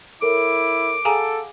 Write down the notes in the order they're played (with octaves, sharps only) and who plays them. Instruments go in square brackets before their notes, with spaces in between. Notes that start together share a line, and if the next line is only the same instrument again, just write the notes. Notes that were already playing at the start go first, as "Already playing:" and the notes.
[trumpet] E4 [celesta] A4 A#4 C#5 [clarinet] D6
[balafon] G#4 G#5 A#5 [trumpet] A4 [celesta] F5 F#5